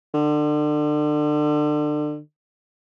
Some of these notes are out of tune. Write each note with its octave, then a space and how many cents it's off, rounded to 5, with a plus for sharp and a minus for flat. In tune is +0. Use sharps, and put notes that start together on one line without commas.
D3 +30